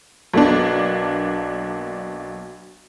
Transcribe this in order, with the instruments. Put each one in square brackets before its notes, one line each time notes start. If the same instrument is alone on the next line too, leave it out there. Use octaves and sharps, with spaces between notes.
[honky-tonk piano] B1 A#3 D4